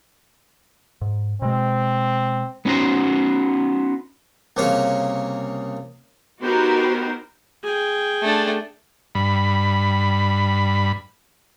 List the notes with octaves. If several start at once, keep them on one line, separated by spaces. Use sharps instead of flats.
G#2
B2 G#3 C4
B3 C#4 D#4 F#4 C5
C2 C#3 A#3 C#5
B3 D#4 F#4 G4 A#4 C5
G#4 G5
A3 D4
G2 B5